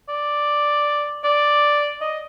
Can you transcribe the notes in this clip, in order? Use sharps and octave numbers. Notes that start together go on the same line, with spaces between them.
D5
D5
D#5